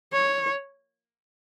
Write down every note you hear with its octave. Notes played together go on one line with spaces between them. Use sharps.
C#5